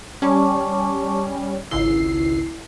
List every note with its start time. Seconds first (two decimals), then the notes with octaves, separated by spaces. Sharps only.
0.22 G3 C#4 A5 C#6 D6
1.71 G#1 C#2 E4 C7